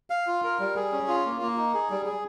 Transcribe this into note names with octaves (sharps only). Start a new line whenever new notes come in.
F5
F4
A#4
G3
G#4
C#4
F4
A#3
A#3
D#4
G#4
G3
G#4